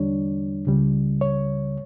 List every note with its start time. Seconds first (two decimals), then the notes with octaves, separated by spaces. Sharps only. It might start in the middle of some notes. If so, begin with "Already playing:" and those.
Already playing: E2 D3 G3 D4 C#5
0.67 C#2 C#3 G3
1.21 C#5